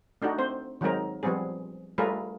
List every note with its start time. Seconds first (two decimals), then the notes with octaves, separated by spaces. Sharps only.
0.22 A3 D4 D#4 F#4
0.39 C4 C5
0.81 D#3 F#3 G#3 C4 D#4 A#4
1.23 F3 G3 B3 C4 G#4
1.98 G3 A3 F4 G#4 A#4 B4